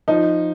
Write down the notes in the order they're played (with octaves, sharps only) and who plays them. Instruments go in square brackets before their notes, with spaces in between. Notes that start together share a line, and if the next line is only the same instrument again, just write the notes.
[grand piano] F3 D#4